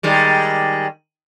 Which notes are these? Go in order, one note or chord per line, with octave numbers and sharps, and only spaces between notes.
D#3 G3 G#3